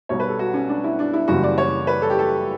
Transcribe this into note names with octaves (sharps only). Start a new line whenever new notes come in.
B1 B2 G3 C#5
B4
A4
F#4
C#4
D4
E4
D4
E4
F#1 F#2 C#3 E3 G3 F#4
D5
C#5
B4
A4
G4
A4